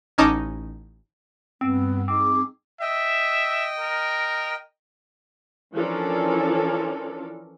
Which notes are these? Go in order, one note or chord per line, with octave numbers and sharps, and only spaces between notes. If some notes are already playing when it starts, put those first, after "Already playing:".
A1 C#4 D#4 A5 D6
G2 B3 C4
C4 D#4 G#4 D6
D#5 E5 G5
A#4
E3 F3 C#4 D4 A4 A#4